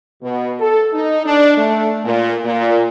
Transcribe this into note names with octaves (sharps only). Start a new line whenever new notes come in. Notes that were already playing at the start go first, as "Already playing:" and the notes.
B2
A4
D#4
D4
A3
A#2
A#2